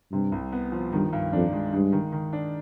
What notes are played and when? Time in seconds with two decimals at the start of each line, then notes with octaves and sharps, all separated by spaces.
0.12 G2 C3
0.32 C2
0.52 B3
0.72 F3
0.92 G2 D#3
1.13 G2
1.33 F2 D4
1.53 G#3
1.73 G2 G#3
1.92 D#3
2.12 D#3
2.33 D4